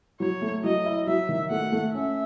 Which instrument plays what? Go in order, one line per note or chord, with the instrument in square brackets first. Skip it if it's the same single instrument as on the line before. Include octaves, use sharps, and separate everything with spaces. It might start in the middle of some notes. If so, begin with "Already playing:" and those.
[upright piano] F#3 [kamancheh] C#5
[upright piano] A3
[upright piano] F#3 [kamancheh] D#5
[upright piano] E4
[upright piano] F#3 [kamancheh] E5
[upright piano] D#3
[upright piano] A3 [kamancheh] F#5
[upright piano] A3
[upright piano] C#4 [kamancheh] E5